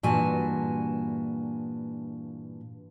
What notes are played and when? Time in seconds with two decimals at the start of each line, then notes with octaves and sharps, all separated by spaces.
0.03 G2 A#2 E3 F#4 G#5 A5